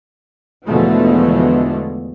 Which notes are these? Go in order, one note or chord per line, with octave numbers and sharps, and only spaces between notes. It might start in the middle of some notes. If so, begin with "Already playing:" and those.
E2 B2 D3 F3 G#3 A3